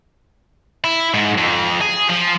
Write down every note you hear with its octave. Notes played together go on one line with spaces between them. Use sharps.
E4
G#2
F2
G#4
F3